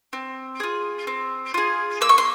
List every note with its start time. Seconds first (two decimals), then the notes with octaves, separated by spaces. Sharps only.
0.13 C4
0.60 F4 G#4
1.07 C4
1.54 F4 G#4
2.01 A#3 E6
2.09 C#6
2.18 C6